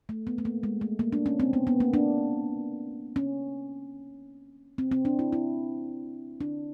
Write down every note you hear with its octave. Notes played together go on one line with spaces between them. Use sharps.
A3
B3
A3
A#3
G#3
A3
A#3
D4
C#4
C4
B3
B3
A#3
D4
C#4
C4
C4
D4
E4
E4
D4